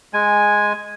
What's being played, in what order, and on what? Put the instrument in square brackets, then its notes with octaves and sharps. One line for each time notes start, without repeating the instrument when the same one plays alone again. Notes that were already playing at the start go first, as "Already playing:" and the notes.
[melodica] G#3 G#5